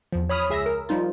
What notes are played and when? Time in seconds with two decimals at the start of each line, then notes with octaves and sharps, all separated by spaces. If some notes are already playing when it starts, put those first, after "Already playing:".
0.12 E2 F3
0.29 C#5 B5 D#6 F6
0.49 C#2 G#4 E5 E6 A#6
0.66 A#4
0.89 F3 G3 D#4 F4